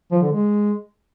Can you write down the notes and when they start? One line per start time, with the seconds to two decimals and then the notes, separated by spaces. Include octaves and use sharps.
0.11 F3
0.22 D3
0.32 G#3